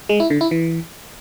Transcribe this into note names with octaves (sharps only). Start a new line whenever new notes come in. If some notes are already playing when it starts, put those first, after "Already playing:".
G#3
E4
D3
E4
E3